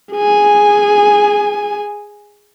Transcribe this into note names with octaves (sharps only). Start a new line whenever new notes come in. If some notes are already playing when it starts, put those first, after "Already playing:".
G#4 G#5